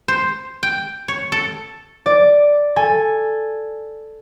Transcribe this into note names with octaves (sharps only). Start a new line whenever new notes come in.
C5
G5
C#5
A4
D5
A4 G#5